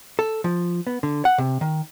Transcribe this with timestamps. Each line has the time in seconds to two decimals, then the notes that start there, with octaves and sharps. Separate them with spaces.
0.19 A4
0.44 F3
0.87 B3
1.03 D3
1.25 F#5
1.38 C3
1.61 D#3